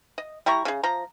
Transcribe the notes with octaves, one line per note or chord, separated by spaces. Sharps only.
D#5
G3 E4 A#5 C#6
C#3 G#4
F3 A#5